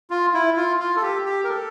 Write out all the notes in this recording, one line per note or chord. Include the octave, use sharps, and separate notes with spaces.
F4
E4
F4
F4
A4
G4
G4
A#4
A4